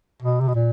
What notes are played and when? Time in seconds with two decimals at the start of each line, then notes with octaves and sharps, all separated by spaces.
0.22 B2
0.40 C3
0.48 B2
0.55 A#2